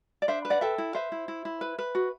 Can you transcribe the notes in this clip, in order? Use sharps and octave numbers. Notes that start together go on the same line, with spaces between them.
D5
D4 C5 E5
B4
D5 F#5
A4 E5 G5
E4
B4 C5 E5
E4
E4
E4
B4
B4
F#4